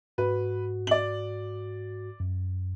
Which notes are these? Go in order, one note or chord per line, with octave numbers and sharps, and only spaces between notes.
G#2 F#4 B4
D5 F#7
F#2